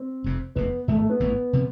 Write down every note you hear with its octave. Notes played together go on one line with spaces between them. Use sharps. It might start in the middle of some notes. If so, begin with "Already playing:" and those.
Already playing: C4
F1 F2 C3
F1 E2 C3 B3
G#1 G#2 F3 A3 B3
A3
B3
A1 G#2 E3
C3 F3